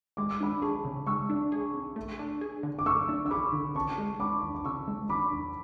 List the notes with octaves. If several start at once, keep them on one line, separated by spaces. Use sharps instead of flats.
G#3 D6
E6
D4 B5 D6
G#4 A5 C#6
C#3
G#3 C#6 E6
D4
G#4
C#3
A3
D4
G#4
D3
D6
A3 C#6 E6
D4
E6
G#4 B5 D6
D3
C#3 A5 C#6
G#3
D4 B5 D6
E2
D6
C#3 C#6 E6
G#3
D4 B5 D6
E2